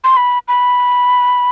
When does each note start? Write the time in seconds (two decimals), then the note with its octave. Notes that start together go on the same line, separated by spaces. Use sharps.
0.04 C6
0.17 B5
0.48 B5